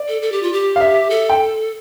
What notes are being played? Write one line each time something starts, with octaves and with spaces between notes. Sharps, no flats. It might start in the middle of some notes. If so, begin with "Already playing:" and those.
Already playing: D5
A4
A4
G4
F4
G4
F5
E5
A4
G5